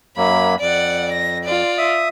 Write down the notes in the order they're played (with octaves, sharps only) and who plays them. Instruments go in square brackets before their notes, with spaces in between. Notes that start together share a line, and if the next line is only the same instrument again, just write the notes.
[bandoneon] F#2 F#3 A#3 [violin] B5
[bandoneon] F2 [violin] D5 F#5
[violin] A#6
F4 D5
[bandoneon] E5 D#6